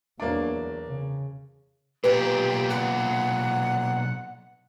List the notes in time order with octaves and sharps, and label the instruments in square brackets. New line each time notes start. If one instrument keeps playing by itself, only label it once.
[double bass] E2 F#3 [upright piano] A#3 D4
[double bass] C#3
[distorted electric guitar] B1 A#2 [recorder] G4 [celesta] B4
[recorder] F#5